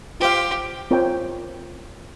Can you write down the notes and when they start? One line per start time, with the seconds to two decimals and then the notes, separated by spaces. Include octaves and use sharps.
0.20 F4 G4 C5 F5
0.91 C4 F4 A#4 C#5 G5